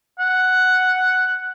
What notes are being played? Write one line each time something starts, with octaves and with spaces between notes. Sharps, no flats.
F#5